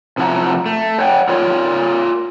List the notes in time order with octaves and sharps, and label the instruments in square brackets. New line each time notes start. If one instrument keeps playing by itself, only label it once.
[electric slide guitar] C3 F3 E4 G4 F#5 A#5
A3
C#5 F#5 G5
F4 A#4 C#5 D5